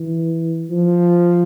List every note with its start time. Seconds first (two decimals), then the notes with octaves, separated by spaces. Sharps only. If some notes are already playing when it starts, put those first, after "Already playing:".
Already playing: E3
0.71 F3